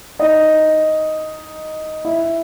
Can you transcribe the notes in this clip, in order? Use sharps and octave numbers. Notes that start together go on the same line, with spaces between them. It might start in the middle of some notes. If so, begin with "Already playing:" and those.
D#4
E4